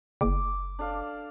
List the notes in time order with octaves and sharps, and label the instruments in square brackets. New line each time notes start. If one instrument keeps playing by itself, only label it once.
[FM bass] F#1 [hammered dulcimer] D6
[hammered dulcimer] D4 A4 F5